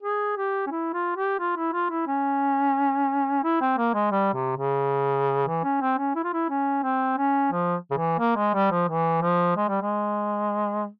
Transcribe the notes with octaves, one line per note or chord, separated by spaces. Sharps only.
G#4
G4
C#4
E4
F4
G4
F4
E4
F4
E4
C#4
E4
C4
A#3
G#3
G3
C3
C#3
E3
C#4
C4
C#4
E4
F4
E4
C#4
C4
C#4
F3
C#3
E3
A#3
G#3
G3
F3
E3
F3
G#3
G3
G#3